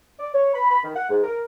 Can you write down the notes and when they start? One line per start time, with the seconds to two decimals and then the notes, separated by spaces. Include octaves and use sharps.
0.19 D5
0.34 C#5
0.54 B5
0.71 B5
0.84 D#3
0.96 F#5
1.10 G#2
1.24 A#4